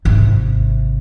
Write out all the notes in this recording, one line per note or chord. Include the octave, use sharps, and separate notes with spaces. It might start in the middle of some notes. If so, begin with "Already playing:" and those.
G#1 C3